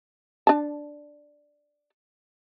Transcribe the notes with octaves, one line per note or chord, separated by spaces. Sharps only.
D4 A5